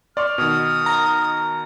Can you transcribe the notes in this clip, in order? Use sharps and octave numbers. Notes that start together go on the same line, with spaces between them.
D5 C6 C#6 F6
B2 D#3 D#6
A#5